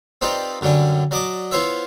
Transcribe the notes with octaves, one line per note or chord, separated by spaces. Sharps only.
C4 D#4 F4 G4 B4 D5
F#2 D3 G3 C#4 D4
F#3 D5 D#5 A5 D6
B3 E4 F4 C5 C#5 E5